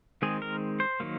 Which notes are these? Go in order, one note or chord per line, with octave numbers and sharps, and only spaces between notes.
D#3 G#3 C4 G#4
A#4
C5
D#3 F#3 A#3